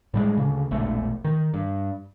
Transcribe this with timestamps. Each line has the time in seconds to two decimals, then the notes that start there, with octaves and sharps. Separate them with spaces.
0.14 A2 G3 G#3
0.37 D2 C#3
0.71 E1 A#1 A3
1.24 D#3
1.54 G2